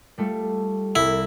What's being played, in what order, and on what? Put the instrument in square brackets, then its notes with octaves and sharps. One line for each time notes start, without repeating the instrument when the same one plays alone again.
[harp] G3 A3 F4
[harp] C2 [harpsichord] E4